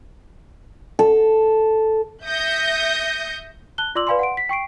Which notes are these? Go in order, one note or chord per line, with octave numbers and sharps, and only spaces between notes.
A4
E5 D#6 G6 A#6 C#7
A5 F#6 G7
F4 D5 C6 D6 E6 F#7
B4 D5 F5 G#5 B5 C6
F#5 C6 D7
B6
G5 C#6 C7 D7